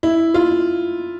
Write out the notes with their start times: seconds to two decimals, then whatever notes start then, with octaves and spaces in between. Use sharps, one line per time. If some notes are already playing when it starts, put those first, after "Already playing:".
0.03 E4
0.34 F4